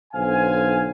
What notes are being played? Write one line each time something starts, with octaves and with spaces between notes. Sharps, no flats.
B1 D3 C5 F5 G#5